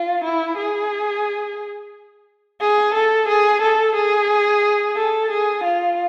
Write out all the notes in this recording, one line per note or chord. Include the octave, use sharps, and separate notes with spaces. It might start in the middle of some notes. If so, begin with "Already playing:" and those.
Already playing: F4
E4
G#4
G#4
A4
G#4
A4
G#4
A4
G#4
F4